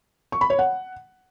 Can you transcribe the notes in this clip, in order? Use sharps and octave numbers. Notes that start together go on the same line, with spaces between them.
C#6
B5
C#5
F#5